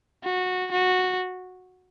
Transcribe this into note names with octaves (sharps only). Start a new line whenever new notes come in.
F#4
F#4